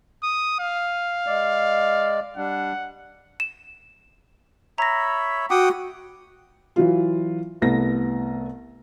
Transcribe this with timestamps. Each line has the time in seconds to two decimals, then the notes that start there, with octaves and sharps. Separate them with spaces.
0.23 D#6
0.60 F5
1.27 G#3 D5
2.37 G3 D4 F#5
3.40 E7
4.78 C#5 E5 A#5 B5 A#6
5.50 F#4 F#5 G5 D6 D#6
6.76 E3 F#3 F4
7.62 C2 A3 B3 A#6